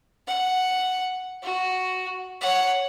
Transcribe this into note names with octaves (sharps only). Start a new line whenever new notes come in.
F#5
F#4
C#5 F#5